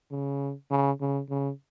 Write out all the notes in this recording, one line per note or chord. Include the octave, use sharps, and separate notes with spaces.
C#3
C#3
C#3
C#3